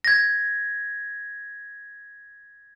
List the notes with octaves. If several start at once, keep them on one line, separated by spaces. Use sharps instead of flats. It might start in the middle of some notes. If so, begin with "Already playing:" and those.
G#6 A#6